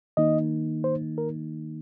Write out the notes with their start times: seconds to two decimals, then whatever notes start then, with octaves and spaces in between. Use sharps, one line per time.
0.17 D#3 A#3 D#4 D#5
0.84 C5
1.18 A#4